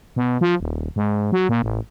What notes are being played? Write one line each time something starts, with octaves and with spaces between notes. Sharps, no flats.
B2
F3
D#1
G#2
F#3
A#2
A1